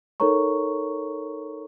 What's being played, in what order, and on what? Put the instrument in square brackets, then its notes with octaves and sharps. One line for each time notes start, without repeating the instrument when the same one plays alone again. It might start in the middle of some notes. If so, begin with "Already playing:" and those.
[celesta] D#4 A4 A#4 C#5 A#5 C#6